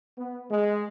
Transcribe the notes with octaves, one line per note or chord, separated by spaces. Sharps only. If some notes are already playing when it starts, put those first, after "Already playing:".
B3
G#3